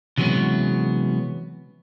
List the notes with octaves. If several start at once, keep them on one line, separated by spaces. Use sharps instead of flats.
C3 E3 F#3 G#3 B3 C#4